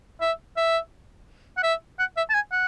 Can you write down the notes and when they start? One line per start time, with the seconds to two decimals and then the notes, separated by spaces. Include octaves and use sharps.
0.21 E5
0.56 E5
1.57 F#5
1.63 E5
1.99 F#5
2.17 E5
2.30 A5
2.34 G#5
2.52 F#5